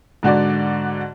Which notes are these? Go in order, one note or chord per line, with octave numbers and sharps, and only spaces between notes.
G#2 D3 F#4 D5